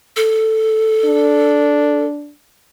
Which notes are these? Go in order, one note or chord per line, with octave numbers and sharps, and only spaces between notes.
A4
D4